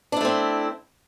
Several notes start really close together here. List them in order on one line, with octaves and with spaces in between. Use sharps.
D4 E4 A3 C4